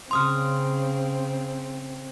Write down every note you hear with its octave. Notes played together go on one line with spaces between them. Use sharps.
C#3 C4 C6 D#6 F6